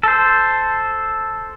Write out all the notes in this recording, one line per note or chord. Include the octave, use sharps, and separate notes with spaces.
A4 C5